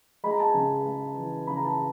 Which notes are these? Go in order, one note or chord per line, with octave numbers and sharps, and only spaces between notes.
G#3 B5
A#5
A5
G#5 A#5
C#3
G#3
E3
C#3 B5
A#5
A5 B5